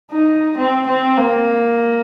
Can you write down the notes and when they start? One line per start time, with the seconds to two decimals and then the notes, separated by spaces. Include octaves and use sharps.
0.12 D#4
0.57 C4
0.87 C4
1.17 A#3